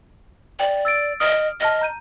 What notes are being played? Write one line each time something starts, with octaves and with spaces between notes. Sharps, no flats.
D5 G5
E6 A6 D7
D#5 D#6 F6 D7
D#5 A5 F6 A#6
A#5 G6 D#7